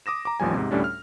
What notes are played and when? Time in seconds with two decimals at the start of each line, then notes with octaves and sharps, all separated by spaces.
0.06 D6 D#6 A#6 E7
0.25 A#5 D6
0.40 A1 D#2 F3 G3 G#5
0.53 G#2 C3
0.71 D2 A2 G3 C#4 D4
0.84 F6